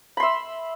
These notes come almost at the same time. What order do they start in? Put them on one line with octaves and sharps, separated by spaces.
B5 C6 E5